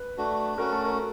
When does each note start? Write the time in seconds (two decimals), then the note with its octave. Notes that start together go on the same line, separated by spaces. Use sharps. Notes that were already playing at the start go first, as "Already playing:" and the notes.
Already playing: B4
0.18 A3 D4 F#4
0.58 A3 C#4 F#4 A#4
0.71 A4
0.85 A#4